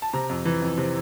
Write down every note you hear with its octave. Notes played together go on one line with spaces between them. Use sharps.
A5
C3 A#5
F2
E3
F2
C3